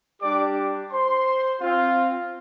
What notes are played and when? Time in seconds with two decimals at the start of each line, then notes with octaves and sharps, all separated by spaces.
0.21 G3 D4 G4 D5 D6
0.91 C5 C6
1.61 C4 F4